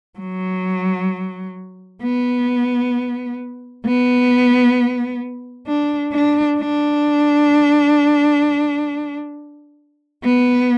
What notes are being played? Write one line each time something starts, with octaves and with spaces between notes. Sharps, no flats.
F#3
B3
B3
D4
D4
D4
B3